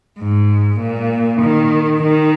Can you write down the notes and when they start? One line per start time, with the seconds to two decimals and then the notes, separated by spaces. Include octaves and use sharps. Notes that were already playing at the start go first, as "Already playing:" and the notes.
0.19 G#2
0.79 A#2
1.41 D#3
2.02 D#3